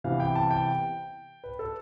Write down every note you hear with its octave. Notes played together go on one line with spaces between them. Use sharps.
C3 E3 B3 F5
G5
A5
G5
B4
A4